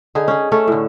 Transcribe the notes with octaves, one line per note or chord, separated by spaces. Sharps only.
D3 D#4 G#4
C#4 G#4
A3 C#4 A4
A2 D3